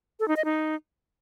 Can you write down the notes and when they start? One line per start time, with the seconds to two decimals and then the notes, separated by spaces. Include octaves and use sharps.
0.20 A4
0.28 D#4
0.36 D#5
0.45 D#4